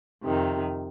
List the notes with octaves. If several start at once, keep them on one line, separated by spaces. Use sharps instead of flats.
F2 C3 D#3